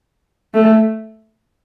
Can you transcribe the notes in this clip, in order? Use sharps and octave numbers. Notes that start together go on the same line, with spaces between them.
A3